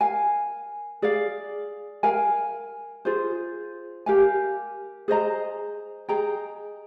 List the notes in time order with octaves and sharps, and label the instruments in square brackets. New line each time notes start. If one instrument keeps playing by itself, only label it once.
[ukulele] A#4 F5 G#5
G#4 D5 F5
A#4 F5 G#5
F4 G#4 C5
G4 A#4 F5 G#5
G#4 C5 D#5 A#5
G#4 D#5 G5 A#5